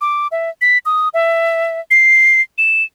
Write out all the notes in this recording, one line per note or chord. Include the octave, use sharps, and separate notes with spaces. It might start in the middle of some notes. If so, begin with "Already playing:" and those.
D6
E5
B6
D#6
E5
C7
E7